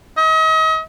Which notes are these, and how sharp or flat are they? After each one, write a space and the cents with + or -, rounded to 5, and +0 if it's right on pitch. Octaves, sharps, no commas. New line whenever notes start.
D#5 +40